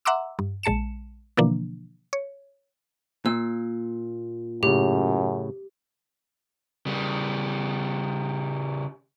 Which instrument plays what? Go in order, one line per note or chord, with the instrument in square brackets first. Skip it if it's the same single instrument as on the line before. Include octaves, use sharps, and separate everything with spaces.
[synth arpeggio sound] E5 F#5 A#5 C6 D6 E6
G2
A#1 G#3 A5 C#7 E7
B2 D3 E3 F3 A#3 D4
C#5
[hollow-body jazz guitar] A#2 [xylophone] E6
[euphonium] F#2 [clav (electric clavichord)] A2 C#3 [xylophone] G4
[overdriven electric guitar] C#3 G3